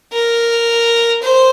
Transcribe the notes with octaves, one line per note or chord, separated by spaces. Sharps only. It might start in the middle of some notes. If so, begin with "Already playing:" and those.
A#4
C5